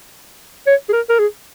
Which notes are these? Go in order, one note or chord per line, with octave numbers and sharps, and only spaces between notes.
C#5
G#4
A#4
A#4
G#4